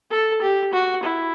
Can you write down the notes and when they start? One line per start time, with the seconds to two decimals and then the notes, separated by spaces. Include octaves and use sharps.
0.11 A4
0.42 G4
0.73 F#4
1.03 E4